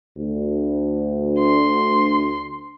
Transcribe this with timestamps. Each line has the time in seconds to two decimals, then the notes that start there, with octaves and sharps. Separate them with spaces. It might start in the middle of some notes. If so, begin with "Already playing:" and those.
0.17 D2
1.39 C6